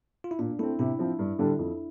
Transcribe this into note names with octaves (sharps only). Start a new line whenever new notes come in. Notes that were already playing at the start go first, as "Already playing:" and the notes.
F4
E4
A#2 D4
A3 C4 E4
C3 E4
F3 C4
G2
D3 G3 D4 A4
F2